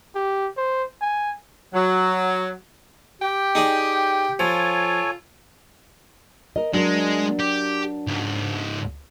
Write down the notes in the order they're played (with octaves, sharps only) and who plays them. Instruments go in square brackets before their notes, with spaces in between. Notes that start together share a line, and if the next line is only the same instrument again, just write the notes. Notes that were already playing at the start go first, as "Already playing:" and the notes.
[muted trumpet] G4
C5
G#5
[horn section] F#3
[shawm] G4 [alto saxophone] G5
[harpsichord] D#4 G#4 D5
[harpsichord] F3 [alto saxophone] F4 [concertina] A4 C#5 G#5
[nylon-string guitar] A#4 D#5
[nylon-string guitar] F#3 A#4 [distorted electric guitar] G#3 [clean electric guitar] D4
[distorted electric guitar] G4
C#2 G#2